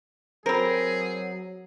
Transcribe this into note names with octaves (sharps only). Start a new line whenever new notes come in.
F#3 C4 G#4 A#4 C5 B5